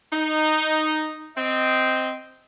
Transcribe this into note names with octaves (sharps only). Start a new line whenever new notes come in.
D#4
C4 D#5